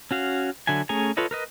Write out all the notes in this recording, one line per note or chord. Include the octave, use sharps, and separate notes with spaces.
C#4 F#4 F5
D3 F#3 E5 G#5
A3 C#4 G#4 G#5 A#5
F4 A4 B4 C#5 D#5
A#4 B4 D#5